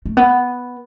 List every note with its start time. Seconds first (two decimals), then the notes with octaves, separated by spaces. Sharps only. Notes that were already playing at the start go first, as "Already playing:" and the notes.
0.06 A3
0.17 B3